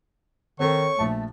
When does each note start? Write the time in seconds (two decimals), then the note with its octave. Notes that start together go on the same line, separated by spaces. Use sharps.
0.60 D#3 C4 A4 C#5 C#6
0.99 A#1 A3 A5